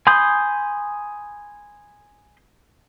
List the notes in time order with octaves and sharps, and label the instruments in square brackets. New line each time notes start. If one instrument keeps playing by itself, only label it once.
[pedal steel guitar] G#5 B5 C6 D#6 G6